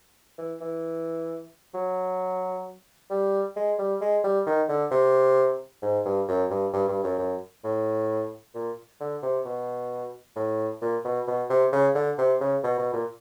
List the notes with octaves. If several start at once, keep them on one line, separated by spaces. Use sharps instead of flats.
E3
E3
F#3
G3
G#3
G3
G#3
G3
D#3
D3
C3
G#2
G2
F#2
G2
G2
G2
F#2
F#2
A2
A#2
D3
C3
B2
A2
A#2
B2
B2
C3
C#3
D3
C3
C#3
B2
B2
A#2